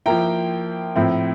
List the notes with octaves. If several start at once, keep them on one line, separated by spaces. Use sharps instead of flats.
F3 A#3 E4 G5 A#5
A2 F3 C4 E4